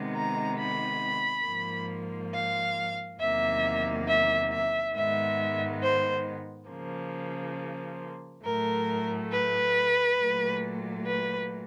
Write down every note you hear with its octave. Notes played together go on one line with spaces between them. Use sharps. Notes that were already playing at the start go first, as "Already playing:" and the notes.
Already playing: C3 D#3 G#3 B3
A#5
B5
G#2 F3 A#3
F5
E2 C3 D#3 F#3 A#3 E5
E5
E5
G#2 D#3 G#3 B3 E5
C5
C#3 F3 A#3
A2 F#3 A3 A#4
B4
A#2 F#3 A3
B4